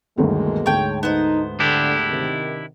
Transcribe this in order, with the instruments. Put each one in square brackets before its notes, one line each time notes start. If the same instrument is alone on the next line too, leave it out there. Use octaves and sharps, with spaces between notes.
[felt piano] G1 D2 D#3 [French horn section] B2 G#3 A#3
[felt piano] D2 G#2 A5 [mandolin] C#5 G5
[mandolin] B3 C5 [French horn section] D#4
[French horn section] D3 [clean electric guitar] D4 E4 G4
[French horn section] C3 D#3